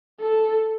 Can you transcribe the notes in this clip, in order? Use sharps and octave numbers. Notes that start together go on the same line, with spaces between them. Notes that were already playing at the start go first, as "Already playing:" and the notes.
A4